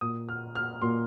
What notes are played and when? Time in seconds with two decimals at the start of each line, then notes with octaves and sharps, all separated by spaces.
0.01 A#2 D#6
0.29 F6
0.55 F6
0.82 A#2 C6